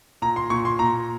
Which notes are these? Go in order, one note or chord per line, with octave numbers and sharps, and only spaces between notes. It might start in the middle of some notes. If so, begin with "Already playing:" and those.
A#2 A#5
C6
A#2 C#6
C6
A#2 A#5